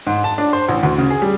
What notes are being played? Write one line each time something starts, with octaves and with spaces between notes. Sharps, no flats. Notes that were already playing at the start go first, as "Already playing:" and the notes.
G#2
A5
D4
C5
A1
D2
C#3
G#4
G3